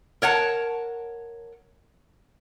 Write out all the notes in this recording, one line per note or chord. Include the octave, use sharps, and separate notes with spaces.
A#4 C#5 F#5 A5